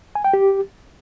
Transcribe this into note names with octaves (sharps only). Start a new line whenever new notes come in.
G#5
G5
G4